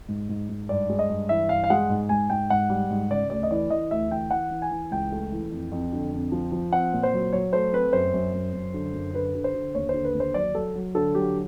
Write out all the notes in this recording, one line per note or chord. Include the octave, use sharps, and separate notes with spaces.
G#2
G#2
G#2
G2 D5
G#3
D#5
G2
E3 E5
G2 F5
F5
G#3 F#5
G#2
G#2 G#5
G#2 G5
G#2 F#5
G3
G#2
C#3 D5
D2 D5
D#5
E3 D5
E3 D#5
D2 E5
E3 G5
E3 F#5
E3
G#5
E3
C#2 G5
A3
E3
F2
F2
D3
F2
F3
F3
C4 F#5
A#2
C5
F#3
F#3 C#5
A3 C5
C4 B4
F#2 C5
F#2
F#2
F#2
D3
F#2
D3 B4
D3
C5
D3
D#2 C#5
D3 C5
B4
D#2
C5
F#3 D5
F#3 A4
F#3
D3 A4
F#3 G4